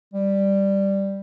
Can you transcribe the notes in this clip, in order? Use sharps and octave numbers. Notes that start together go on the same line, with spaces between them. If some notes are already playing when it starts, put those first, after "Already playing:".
G3